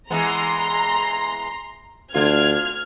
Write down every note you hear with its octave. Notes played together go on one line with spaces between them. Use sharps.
E3 G#3 B3 A#5 C6
D2 D4 F4 F6 G#6